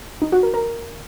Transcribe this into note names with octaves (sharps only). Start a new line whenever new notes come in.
D#4
F#4
A#4
A#4